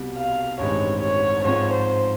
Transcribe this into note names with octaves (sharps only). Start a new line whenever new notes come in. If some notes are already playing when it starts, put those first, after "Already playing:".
Already playing: C2 B2 G3
F5
A1 G2 D#3 G#3 C4 C#5
C#5
G#2 F3 G#3 C4 F4 C#5
C5